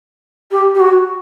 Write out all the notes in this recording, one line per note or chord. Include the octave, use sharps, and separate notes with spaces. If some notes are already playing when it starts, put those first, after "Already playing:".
G4
G4
F#4